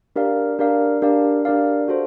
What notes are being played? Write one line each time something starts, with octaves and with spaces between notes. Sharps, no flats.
D4 G4 A#4 D5 F5
D4 G4 A#4 D5 F5
D4 G4 A#4 D5 F5
D4 G4 A#4 D5 F5
F#4 A4 C5